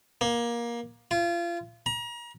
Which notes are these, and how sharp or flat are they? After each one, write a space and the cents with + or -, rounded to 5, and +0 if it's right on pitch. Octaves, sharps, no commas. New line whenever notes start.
A#3 +20
F4 -30
A#5 +35